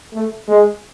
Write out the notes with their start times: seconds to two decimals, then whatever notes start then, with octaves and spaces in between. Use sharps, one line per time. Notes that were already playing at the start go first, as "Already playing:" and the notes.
0.13 A3
0.48 G#3